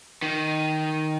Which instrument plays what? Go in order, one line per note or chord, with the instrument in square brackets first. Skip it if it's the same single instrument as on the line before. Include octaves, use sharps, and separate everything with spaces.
[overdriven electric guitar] D#3